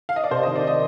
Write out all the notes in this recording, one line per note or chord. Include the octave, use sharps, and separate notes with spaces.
F5
D#5
D5
C3 C5
D#3 D#5
D5
D#3 D#5